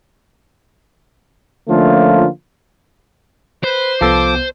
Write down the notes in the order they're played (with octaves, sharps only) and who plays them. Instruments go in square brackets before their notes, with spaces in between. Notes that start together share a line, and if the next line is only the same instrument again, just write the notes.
[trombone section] D3 F3 A3 A#3 C#4 F4
[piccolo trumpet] B4 [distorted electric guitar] C5
[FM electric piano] C2 B3 [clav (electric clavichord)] F3 A4 [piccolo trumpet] D6